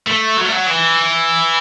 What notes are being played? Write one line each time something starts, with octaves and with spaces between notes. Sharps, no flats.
A3
F#3
A3
F#3
E3